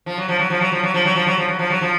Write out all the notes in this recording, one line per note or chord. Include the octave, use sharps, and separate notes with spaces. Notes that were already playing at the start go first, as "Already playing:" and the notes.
F3
F#3
F3
F#3
F3
F#3
F3
F#3
F3
F#3
F3
F#3
F3
F#3
F3
F#3
F3